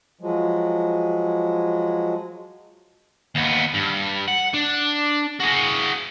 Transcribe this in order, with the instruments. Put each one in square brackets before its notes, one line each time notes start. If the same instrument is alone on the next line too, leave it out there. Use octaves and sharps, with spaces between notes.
[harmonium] F3 F#3 G#3
[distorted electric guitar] D#2 B3
G2
F#5
D4
F#4 G#4